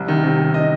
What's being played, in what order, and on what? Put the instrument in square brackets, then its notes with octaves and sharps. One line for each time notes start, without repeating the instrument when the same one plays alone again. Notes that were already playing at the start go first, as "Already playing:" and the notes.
Already playing: [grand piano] C2
D#3
C3
C3
D#3 D#5